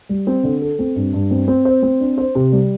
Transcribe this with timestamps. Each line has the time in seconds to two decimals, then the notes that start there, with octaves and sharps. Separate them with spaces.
0.09 G3
0.27 C4
0.43 D3
0.62 A4
0.79 C4
0.96 G2
1.13 G2
1.31 C4
1.48 C4
1.65 C5
1.83 C4
2.00 D4
2.18 C5
2.35 C3
2.52 G3